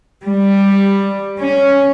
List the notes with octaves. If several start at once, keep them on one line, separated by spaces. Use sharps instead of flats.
G3
C#4